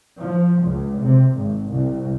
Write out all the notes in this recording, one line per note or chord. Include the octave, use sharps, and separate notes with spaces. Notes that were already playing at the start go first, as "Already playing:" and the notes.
F3
C#2
C3
G#1
C2